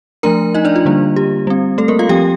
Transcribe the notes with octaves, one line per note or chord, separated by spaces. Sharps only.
F3 A3 D4 A#4 A#5
D#4 D#5
D4 D5
F4
D3 G3 A#3 D4
G4
G3 C4
A3 A4
A#3 A#4
F4 F5
F3 C4 G4 G5